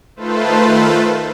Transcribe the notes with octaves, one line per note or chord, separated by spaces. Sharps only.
D#3 A3 F4 A4 B4 C5